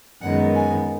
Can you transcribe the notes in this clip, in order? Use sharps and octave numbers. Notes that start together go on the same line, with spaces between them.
F#2 D#3 G#3 B3 F#5
G#5